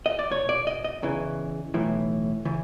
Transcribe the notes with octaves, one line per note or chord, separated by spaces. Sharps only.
D#5
D5
B1 B2 C#5
D5
D#5
D#5
E2 C#3 E3
B1 A2 E3
C#3 E3